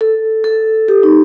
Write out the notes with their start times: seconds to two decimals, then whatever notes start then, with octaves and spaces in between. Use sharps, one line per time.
0.01 A4
0.44 A4
0.88 G4
1.03 D#4